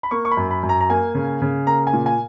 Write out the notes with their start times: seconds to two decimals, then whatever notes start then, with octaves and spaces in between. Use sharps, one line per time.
0.03 B5
0.11 A#3 C#6
0.25 C#6
0.31 B5
0.37 F#2
0.51 B5
0.63 F#2
0.69 A#5
0.81 A#5
0.89 A#3 G#5
1.15 C#3
1.42 C#3
1.67 A#3 A#5
1.87 G#5
1.93 A#2
2.06 G#5